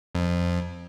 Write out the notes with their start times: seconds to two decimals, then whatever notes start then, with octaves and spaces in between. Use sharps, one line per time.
0.15 F2